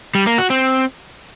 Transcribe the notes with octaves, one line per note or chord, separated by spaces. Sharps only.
G3
A#3
F#4
C4